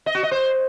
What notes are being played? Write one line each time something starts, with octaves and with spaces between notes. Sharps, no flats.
D#5
F#4
D#5
C5